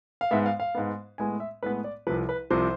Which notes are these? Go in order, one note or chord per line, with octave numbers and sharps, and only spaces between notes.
F5
G#2 G#3 B3 E5
F5
F5
G#2 G#3 B3
A2 G#3 B3 G#5
E5
A2 G#3 B3 B4
D5
C2 C3 F3 B4
B4
C2 C3 F3 C5